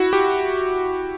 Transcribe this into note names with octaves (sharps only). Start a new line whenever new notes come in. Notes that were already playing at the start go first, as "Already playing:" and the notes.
Already playing: E4 F#4
G4